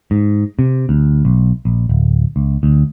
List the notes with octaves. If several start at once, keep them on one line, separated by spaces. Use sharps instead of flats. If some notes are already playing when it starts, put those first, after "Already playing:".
G#2
C3
D2
B1
A#1
D1
C#2
D2